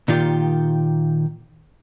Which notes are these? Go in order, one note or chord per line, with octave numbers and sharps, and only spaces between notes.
A#2 D#3 F4 G4